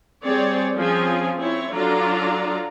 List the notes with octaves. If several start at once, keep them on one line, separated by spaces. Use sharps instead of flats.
G3 C4 G#4 C#5 D5
F3 C4 C#4 F4 G#4 G#5
C4 E4 C#5
F#3 D4 F4 A4 D5 A#5